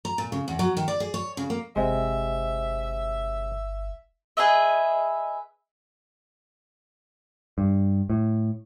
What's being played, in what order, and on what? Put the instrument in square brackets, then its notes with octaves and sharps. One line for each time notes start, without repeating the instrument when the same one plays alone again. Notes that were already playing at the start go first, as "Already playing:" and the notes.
[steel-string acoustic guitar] A#5
A#2
C#3
E2
F#3
D#3
D5
G#4
C#5
C#3
A#3
[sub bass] G1 [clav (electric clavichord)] C3 G#3 [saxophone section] E5
[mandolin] G#4 B4 D#5 E5
[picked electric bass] G2
A2